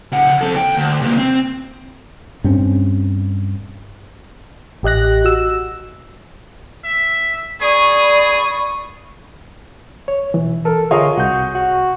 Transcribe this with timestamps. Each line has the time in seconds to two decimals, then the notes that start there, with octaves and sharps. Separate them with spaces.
0.12 C#3 F#5
0.41 C4 A4
0.53 D#2 G5
0.77 D2
1.01 C3 A#3
1.18 C4
2.44 G2 C4 C#4
4.83 A1 G4 D#5 F#6 A#6
5.25 F#4 E6
6.85 E5
7.62 G#4 D5 B5 C#6 D#6
10.08 C#5
10.34 B2 E3
10.65 A4 A#4
10.91 D3 F4 G#4 A#4 C#5 D#5
11.17 C2 F#4 G6
11.55 F#4